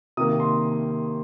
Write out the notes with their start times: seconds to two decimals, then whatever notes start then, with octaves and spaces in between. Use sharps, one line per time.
0.17 C3 D#3 A#3 D#6
0.40 C6